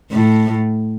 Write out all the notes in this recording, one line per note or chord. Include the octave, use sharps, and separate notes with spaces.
A2